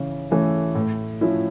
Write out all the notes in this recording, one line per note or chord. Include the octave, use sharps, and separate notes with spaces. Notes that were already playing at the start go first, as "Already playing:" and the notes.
Already playing: C#3 E3 C#4
E3 A3 C#4
A2
F3 C#4 E4